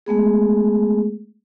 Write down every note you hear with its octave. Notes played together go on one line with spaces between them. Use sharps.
G#3 A3 B3 G#4